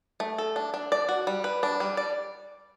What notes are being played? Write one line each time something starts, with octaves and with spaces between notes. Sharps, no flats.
A3
A4
D4
D4
D5
F#4
G3
B4
D4
G3
D5